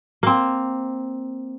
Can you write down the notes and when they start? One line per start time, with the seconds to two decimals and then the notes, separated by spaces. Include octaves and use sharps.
0.23 A#3 C4